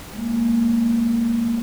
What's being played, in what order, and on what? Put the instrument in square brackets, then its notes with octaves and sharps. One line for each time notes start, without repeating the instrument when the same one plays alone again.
[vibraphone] G#3 A#3